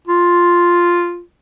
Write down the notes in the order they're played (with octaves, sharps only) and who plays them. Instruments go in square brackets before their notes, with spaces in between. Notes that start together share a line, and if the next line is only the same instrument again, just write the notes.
[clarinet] F4